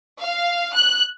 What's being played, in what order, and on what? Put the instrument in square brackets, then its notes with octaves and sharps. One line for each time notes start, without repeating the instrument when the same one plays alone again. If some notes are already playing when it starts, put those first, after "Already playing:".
[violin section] F5
F#6